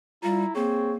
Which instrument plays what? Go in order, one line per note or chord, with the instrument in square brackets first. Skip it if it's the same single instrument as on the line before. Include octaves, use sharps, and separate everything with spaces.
[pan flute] G3 [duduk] E4 [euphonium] F4 [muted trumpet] A#5
[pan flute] A#3 [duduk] C4 [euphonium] G#4 [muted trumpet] C#5